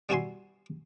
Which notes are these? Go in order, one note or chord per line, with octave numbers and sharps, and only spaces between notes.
G3 B3 E4 F#4 G#5 C6